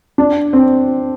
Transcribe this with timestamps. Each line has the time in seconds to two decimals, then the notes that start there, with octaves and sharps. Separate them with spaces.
0.18 D4
0.53 C4